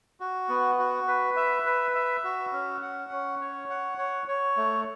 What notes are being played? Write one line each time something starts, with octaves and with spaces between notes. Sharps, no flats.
F#4
B3
F#4
B4
E5
B4
E5
F#4
C#4
F#5
C#4
C#5
F#5
C#5
C#5
A3